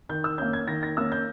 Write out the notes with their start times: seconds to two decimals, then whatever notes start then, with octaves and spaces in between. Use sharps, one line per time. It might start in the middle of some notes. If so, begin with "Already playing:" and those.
0.09 D#3 G6
0.24 E6
0.38 A#3 C#4 G6
0.53 G#6
0.68 D#3 A#6
0.83 A#6
0.97 A#3 C#4 E6
1.12 G6